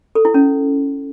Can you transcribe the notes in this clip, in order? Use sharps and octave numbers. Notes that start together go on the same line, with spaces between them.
A4
E4
C#4